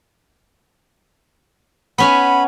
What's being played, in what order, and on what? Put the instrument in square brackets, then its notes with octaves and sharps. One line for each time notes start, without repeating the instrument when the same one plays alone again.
[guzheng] B3 C#4 G#5 [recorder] B5